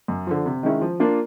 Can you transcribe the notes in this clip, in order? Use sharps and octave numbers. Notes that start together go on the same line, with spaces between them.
F#2
D3 F3
C3
D#3 G#3 C#4 E4
F3
A#3 D4 F4